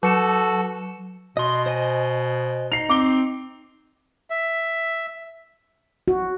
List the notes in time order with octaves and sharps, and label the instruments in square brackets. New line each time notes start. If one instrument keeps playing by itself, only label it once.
[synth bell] F#3 C#7 E7 [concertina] F#4 A4
[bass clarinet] B2 [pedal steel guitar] D#5 C6
[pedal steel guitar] C5 D#5 G#5
[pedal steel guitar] D#4 [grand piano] C7 F7
[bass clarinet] C4 [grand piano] D6 G7
[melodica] E5
[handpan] F#4